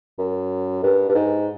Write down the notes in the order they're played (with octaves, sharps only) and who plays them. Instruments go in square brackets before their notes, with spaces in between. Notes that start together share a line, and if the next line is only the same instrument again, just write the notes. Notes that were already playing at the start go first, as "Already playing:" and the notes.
[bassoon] F#2
G2
G2
G#2